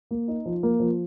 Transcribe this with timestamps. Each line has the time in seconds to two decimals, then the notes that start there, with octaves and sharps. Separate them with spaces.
0.11 A#3
0.28 D#4
0.46 F3
0.63 A#3
0.80 F3